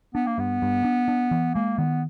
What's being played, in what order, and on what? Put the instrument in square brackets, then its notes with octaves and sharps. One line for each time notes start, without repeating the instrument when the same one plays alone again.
[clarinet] B3 [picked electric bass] D4
[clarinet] A#3
[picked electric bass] G2 [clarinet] B3
[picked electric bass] G2
D4
D4
E3
[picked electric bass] G#3 [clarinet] A#3
[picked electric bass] D#3 [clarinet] B3